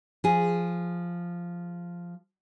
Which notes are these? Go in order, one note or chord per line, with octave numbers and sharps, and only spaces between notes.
F3 G#4